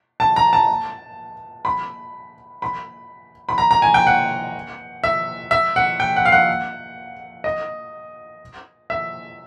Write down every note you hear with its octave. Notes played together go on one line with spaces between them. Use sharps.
A5
A#5
A5
B5
B5
B5
A#5
A#5
G#5
G5
F#5
E5
E5
F#5
G5
F#5
F5
F#5
D#5
E5